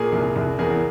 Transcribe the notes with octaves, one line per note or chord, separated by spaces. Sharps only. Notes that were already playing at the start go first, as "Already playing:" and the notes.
Already playing: A#2 G#4 A#4
C2
C2
E2 G#4 A#4